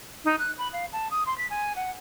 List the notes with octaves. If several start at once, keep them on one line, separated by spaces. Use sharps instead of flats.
D#4
F#6
B5
F5
A5
D#6
C6
B6
G#5
F#5